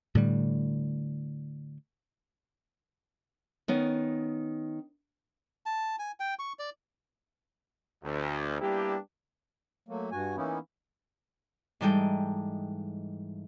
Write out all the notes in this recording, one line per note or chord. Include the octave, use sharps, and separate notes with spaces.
A2 D3 G3
D#3 B3 C#4
A5
G#5
G5
C#6
D5
D2
G3 A#3 B3 D4 E4 G4
F#3 A3 A#3
G2 F#4 G#5
E3 A#3 B3 C#4 D#4 E4
G#2 E3 G3 A4 D#5 G5